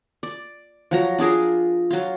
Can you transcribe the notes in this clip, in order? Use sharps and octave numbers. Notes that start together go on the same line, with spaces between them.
D5
F3 F#3 A#5
D4 F4 G#4 A#4
F#3 F4